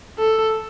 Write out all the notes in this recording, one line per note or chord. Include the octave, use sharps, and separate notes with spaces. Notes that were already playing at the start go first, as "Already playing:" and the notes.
A4